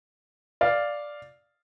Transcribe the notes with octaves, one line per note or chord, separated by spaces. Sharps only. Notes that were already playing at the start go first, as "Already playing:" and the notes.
D5 F5